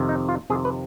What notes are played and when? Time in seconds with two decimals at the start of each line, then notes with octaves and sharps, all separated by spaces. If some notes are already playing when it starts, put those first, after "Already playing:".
Already playing: F2 C3 D#3
0.09 D#4
0.29 F4
0.50 F2 C3 D#3 G#4
0.65 B4